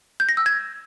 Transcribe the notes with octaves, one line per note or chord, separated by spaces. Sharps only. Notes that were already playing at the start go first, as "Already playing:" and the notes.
G6
A#6
E6
G#6